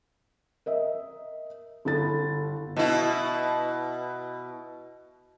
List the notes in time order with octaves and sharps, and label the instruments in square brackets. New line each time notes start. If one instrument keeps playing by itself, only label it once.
[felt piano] A#4 D#5 E5
G1 E4 A4 A6
[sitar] B2 E4